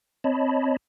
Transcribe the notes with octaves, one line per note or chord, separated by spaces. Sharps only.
C4 C#5 D#5 A5 B5